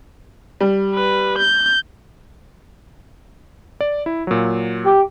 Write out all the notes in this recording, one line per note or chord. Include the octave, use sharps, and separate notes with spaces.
G3
B4
G6
D5
E4
A#2 F#3
G4